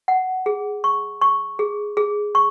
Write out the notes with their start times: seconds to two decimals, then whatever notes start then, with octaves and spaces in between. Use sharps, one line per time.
0.08 F#5
0.46 G#4
0.84 C#6
1.22 C#6
1.59 G#4
1.97 G#4
2.35 C#6